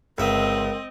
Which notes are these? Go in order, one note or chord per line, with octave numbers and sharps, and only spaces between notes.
G1 C#2 C4 A#4 D#5 E5